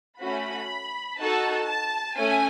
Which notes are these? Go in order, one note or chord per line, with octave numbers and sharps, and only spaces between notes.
A3 C#4 F#4 B5
D#4 F#4 A4 A5
A5
A3 C#4 G#5